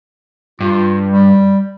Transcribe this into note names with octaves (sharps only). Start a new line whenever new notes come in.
G2 F4
G3